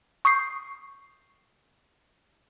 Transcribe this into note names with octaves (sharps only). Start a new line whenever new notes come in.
C#6 D#6 G6 C7